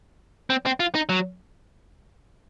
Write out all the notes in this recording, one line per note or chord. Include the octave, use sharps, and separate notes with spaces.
C4
C4
F4
D#4
F#3